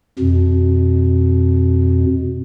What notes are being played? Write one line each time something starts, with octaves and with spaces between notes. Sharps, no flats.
F2 B2